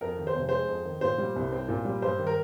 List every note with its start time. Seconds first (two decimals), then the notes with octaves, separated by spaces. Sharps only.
0.01 F2 A#4
0.18 D#3
0.27 C5
0.35 F1
0.49 G#3 C5
0.68 F2
0.85 D#3
1.01 A#2 C5
1.18 G3
1.36 C2
1.52 C4
1.68 A#2
1.85 G3
2.02 G2 C5
2.19 D#3
2.27 A#4